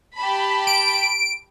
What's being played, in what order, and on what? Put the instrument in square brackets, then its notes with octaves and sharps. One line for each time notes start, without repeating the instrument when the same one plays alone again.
[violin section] G4 A5 B5
[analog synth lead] D7